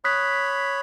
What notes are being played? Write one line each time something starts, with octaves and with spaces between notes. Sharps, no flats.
C#5 B5 D#6 F#6 B6